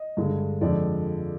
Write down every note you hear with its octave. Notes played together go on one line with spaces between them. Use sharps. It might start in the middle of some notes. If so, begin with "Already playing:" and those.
Already playing: D#5
G2 D3 G#3
F2 D3 G#3 D5